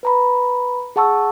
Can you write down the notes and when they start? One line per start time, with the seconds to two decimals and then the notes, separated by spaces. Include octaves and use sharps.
0.03 B4 A#5 B5
0.96 G#4 F#5 A5 C#6 E6